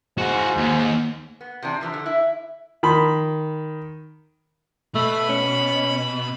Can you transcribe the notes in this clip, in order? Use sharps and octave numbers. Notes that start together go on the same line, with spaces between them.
G#2 F#4 F5
D#2
B3
C3 E3 D4
F#2 E3 F3
D3
E4 E5
D#3 B5 C6
B2 A3 B5
C#4